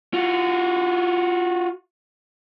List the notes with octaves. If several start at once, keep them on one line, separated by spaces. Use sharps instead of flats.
F4 F#4